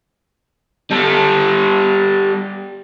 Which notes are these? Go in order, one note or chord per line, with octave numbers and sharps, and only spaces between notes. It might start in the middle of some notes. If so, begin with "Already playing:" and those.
G3 A4